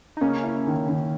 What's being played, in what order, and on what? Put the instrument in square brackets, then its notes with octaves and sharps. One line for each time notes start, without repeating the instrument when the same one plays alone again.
[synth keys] D#4
[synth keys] C#3 C#4 [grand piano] A#3
[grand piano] E4
D#3
D#3